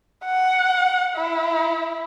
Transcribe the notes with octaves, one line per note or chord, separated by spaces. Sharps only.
F#5
E4